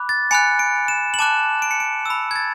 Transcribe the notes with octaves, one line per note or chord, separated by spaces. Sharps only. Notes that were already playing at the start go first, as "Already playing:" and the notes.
Already playing: B5 D6 F#6
A6
G#5 B5 F#6 C#7
D7
E7
F#7
A5 D6 F#6 E7
D7
C#7
D7
B5 E6
G#6
A6